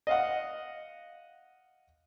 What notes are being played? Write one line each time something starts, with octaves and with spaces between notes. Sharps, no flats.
D#5 F5 F#5